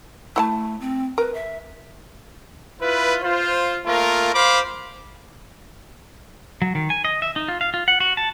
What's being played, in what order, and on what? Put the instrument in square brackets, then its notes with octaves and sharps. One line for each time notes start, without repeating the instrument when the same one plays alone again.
[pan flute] A3 [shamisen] E4 F#5 A5
[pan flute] C4
[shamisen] A#4 [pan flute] B4
[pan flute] E5
[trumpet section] E4 F4 B4
F4 C5
A3 A#3 F4 A#4
C5 F5 B5 D6
[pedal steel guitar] F#3
D#3
G#5
D#5
E5
D#4
F4
F5
F4
F#5
F#4
A5